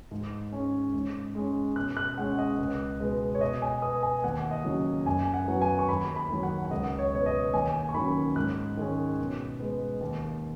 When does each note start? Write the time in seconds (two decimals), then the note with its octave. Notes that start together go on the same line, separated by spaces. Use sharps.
0.11 G#2
0.53 G#3 C#4
0.94 G#2
1.35 G#3 C#4
1.76 B2 F#6
1.97 F#6
2.17 G#3 C#4 F#5
2.38 D#5
2.59 C#2
3.00 B2 G#3 B3
3.35 C#5
3.41 B2 D#5
3.62 G#5
3.82 B3 D#6
4.03 G#5
4.24 D#2 F#5
4.51 D#5
4.65 C#3 F#3
5.06 F#2 G#5
5.25 G#5
5.34 F#5
5.48 F#3 B3
5.62 G#5
5.79 C#6
5.88 D#2 B5
6.16 B5
6.30 D#3 F#3
6.43 F#5
6.65 F#5
6.71 C#2 D#5
6.99 C#5
7.12 B2 B3 C#5
7.26 D#5
7.53 D#2 G#5
7.89 C#6
7.94 D#3 F#3 C#4 B5
8.36 G#2 F#6
8.77 D#3 G#3 C#4
9.18 B2
9.60 G#3 B3
10.01 D#2